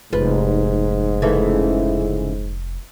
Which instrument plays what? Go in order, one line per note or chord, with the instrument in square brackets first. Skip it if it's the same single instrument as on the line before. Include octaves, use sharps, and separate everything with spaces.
[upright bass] F1 [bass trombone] G#2 [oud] F4 B4
[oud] C#3 E3 A3